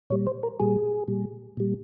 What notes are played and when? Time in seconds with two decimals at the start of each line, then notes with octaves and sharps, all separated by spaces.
0.10 A#2 G3 C#5
0.27 C5
0.43 A#4
0.60 A#2 G3 G#4
1.08 A#2 G3
1.57 A#2 G3